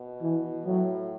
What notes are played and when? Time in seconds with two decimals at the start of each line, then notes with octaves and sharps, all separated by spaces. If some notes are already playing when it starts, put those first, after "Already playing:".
Already playing: B2
0.21 E3
0.66 A2 F#3